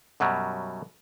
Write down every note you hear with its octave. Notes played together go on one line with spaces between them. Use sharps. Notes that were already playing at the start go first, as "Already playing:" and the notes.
F#2 B2 F#3 G3